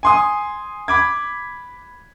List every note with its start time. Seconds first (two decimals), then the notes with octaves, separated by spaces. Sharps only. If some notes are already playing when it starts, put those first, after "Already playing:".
0.03 G#5 C6 D#6
0.88 B5 D6 G#6